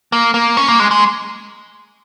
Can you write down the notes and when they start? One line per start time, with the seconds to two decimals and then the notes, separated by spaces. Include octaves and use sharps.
0.12 A#3
0.34 A#3
0.57 C#4
0.68 A#3
0.80 G#3
0.91 G#3